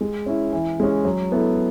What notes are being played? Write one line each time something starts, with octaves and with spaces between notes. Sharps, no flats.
G#3
C#4 E4
E3
G#3 C#4
F#3
B3 E4 A4